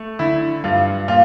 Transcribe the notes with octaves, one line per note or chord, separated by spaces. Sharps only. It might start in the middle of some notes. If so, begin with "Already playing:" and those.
Already playing: A3
D3 E4
G2 F4
A#2 F4